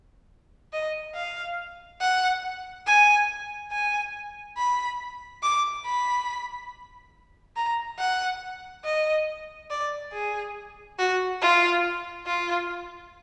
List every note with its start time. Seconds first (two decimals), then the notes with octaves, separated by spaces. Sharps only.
0.73 D#5
1.15 F5
2.01 F#5
2.87 G#5
3.72 G#5
4.57 B5
5.43 D6
5.86 B5
7.56 A#5
7.99 F#5
8.85 D#5
9.71 D5
10.13 G#4
10.99 F#4
11.42 F4
12.27 F4